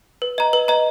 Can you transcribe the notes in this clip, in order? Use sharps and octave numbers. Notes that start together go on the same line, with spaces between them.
B4
D#5 A#5
B4
D#5 A#5